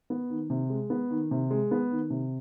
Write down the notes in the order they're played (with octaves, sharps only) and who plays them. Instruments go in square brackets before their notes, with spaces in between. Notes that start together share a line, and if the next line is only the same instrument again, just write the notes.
[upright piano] B3
D#3
C3
G#3
B3
D#3
C3
G#3
B3
D#3
C3